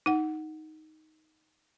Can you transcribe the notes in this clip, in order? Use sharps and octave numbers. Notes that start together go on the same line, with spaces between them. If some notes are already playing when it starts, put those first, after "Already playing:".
D#4 F#5